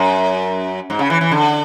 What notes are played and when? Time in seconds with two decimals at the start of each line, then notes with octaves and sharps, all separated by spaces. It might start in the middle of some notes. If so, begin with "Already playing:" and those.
Already playing: F#2
0.90 G#2
0.99 C#3
1.10 E3
1.21 E3
1.31 D3